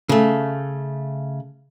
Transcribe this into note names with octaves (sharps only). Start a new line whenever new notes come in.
C#3 A3